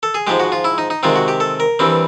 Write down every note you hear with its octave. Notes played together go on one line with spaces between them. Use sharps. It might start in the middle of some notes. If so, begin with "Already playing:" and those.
A4
G#4
G#2 F3 G#3 G4
F#4
F4
E4
D#4
D#4
C3 D#3 G#3 C4 F4
F#4
G4
A4
A#4
G2 E3 G3 C4